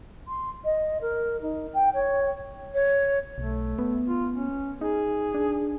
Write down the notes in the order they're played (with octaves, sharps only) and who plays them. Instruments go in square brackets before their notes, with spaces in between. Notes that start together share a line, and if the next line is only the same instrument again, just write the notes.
[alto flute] C6
D#5
A#4
D#4
G5
C#5
[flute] C#5
[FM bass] B1 [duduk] A3
[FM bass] B3
[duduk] F4
C#4
[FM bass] D#4 [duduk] G#4
[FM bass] D4